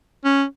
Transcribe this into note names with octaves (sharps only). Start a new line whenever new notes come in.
C#4